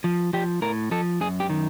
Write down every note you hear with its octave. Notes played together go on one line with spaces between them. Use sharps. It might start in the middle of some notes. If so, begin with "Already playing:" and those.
F3
F3 G4
A2 A#4
F3 A4
F#2 G#4
G4
D#3